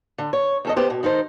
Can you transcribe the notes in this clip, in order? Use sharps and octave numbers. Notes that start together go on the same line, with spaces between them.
D3
C#5
E2 A4 D#5
B3 G4 C5
B2
D#3 D#4 A4 C5